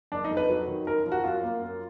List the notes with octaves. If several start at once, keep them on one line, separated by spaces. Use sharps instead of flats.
F#1 D4
D#4
F2
B4
F#3
D#3
F#2 A#4
F3
F#4
F#2 F4
A#3
F#2